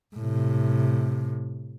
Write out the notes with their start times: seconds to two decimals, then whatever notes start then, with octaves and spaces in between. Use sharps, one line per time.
0.16 A2 C3